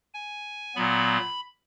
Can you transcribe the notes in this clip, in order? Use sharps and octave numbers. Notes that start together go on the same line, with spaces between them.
G#5
A#2 F#3 B3 B5